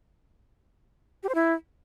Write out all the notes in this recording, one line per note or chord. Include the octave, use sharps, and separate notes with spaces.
G4
C5
E4